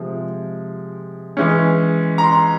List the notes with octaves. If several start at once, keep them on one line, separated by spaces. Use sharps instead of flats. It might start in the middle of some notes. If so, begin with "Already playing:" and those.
Already playing: C3 F3 G#3
E3 G#3 C#4
A#5
C6